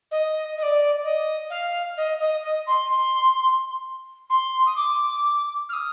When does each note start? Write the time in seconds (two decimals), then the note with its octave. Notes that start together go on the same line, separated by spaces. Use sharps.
0.11 D#5
0.58 D#5
0.62 D5
1.04 D#5
1.50 F5
1.97 D#5
2.20 D#5
2.43 D#5
2.67 C6
4.30 C6
4.66 D#6
4.76 D6
5.69 F6
5.73 D#6